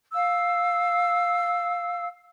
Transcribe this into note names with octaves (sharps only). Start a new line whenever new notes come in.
F5 E6